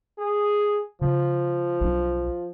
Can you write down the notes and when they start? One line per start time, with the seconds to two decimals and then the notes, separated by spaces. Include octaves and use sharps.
0.18 G#4
1.01 C#3 F3
1.81 B1 D4